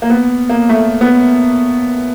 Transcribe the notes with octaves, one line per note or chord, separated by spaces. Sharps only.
A#3
B3
A#3
A3
B3